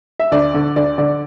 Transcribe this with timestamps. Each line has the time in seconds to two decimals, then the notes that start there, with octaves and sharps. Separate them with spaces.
0.19 E5
0.32 D2 D5
0.54 D3
0.76 D2 D5
0.98 D3 D5